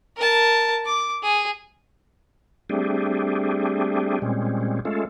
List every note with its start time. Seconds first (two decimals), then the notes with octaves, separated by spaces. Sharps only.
0.17 A#4 A5
0.85 D6
1.23 G#4
2.70 G3 A3 C4 D4 G4 G#4
4.22 A#2 G3 G#3 C4 C#4
4.85 G#3 A3 C#4 F4 A4